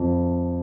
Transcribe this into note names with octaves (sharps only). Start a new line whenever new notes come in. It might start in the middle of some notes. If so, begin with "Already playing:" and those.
Already playing: F2